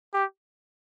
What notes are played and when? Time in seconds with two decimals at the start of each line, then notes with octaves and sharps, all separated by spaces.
0.14 G4